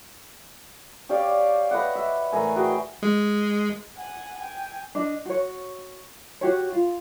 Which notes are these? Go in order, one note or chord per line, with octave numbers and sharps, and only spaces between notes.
G4 C#5 D5 F5
B4 D#5 E5 F#5
E5
A2 E3 A#4 G#5
F#4 G#4 B4 G5
G#3
F#5 G#5
G5 G#5
D4 D#5
F#4 C#5
F#4 G4 C#5
F4